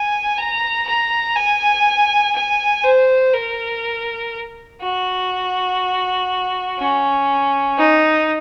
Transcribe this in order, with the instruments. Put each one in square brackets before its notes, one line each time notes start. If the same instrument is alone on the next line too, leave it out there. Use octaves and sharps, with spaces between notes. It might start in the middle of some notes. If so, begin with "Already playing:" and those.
Already playing: [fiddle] G#5
A#5
A#5
G#5
G#5
C5
A#4
F#4
C#4
D#4